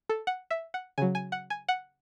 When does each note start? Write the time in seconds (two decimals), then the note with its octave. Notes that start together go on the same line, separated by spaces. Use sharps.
0.09 A4
0.27 F#5
0.50 E5
0.74 F#5
0.98 C#3 F#3 G#5
1.15 G#5
1.32 F#5
1.50 G#5
1.69 F#5